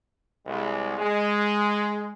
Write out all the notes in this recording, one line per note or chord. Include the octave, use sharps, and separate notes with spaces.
C2 G#3
G#3